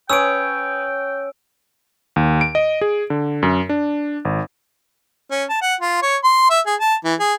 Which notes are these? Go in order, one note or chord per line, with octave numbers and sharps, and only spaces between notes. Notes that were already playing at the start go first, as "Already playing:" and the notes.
C#4 B4 C#5 G5 D#6 E6 D7
D#2
D7
D#5
G#4
D3
F#2
D4
G#1
C#4
A5
F#5
F4
C#5
C6
E5
G#4
A5
E3
G#4